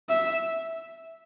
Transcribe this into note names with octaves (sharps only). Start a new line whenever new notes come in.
E5